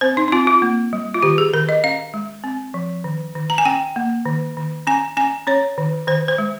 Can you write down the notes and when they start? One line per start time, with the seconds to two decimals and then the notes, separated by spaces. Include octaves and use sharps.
0.01 C4 C5
0.17 D#4
0.28 D#4
0.32 C4 F4
0.47 F4
0.62 A#3
0.93 G3
1.14 F4
1.23 D#3 G4
1.38 G#4
1.54 D#3 A#4
1.69 D#5
1.84 C#4 F5
2.14 G#3
2.44 C4
2.74 F3
3.04 D#3
3.35 D#3
3.50 A#5
3.58 G#5
3.65 C#4 G5
3.96 A#3
4.26 D#3
4.57 D#3
4.87 C#4 G#5
5.17 C#4 G#5
5.47 C#4 C#5
5.78 D#3
6.08 D#3 C5
6.28 C5
6.38 G#3